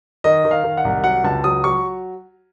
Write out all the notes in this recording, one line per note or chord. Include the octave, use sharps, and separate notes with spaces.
D#3 D#5
D#3
F5
D#3
F#5
C2
F#3 F#5
C#2 A5
F#3 D#6
F#3 C#6